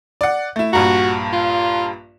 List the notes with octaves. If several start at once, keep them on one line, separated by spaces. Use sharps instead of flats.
D5 F#5
A3 E4
A#1 G2 F#4 A#5
F4